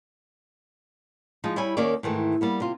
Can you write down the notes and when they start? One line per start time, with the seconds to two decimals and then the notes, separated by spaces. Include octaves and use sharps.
1.44 F3 G#3 D#4
1.56 G3 E4 C#5 G#5
1.77 D#2 D#3 A#3 C#4 C#5 D5
2.03 G#2 D#3 E3 A3
2.41 G3 A#3 B3
2.60 C3 F4